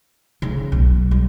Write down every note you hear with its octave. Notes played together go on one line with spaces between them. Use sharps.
C#3
B1
G3